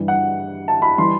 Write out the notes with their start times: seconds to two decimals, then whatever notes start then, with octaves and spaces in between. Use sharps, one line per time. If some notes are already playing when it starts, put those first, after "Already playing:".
Already playing: G2 E3 G3
0.08 F#5
0.68 A5
0.82 B5
0.98 E3 G3 C6